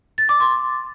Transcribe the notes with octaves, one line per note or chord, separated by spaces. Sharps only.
A6
D6
C6